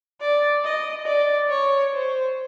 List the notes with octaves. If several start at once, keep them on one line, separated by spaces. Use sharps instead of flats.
D5
D#5
D5
C#5
C5